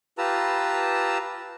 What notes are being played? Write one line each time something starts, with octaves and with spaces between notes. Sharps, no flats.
F4 G4 B4 A5 A#5 E6